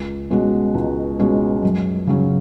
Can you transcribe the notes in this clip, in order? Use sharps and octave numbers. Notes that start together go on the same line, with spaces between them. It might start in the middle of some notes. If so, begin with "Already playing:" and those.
Already playing: C#2
B2 G#3 C#4 F#4
C#2
B2 G#3 C#4 F#4
F#2
C#3 F#3 C#4